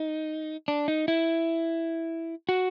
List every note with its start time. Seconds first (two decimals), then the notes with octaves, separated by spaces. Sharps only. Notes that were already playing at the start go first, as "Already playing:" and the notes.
Already playing: D#4
0.68 D4
0.88 D#4
1.08 E4
2.49 F#4